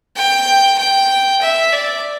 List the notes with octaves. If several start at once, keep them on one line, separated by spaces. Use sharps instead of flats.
G5
G5
E5
D5